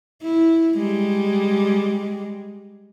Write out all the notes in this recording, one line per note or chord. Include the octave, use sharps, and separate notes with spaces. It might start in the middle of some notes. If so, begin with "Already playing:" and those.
E4
G3 G#3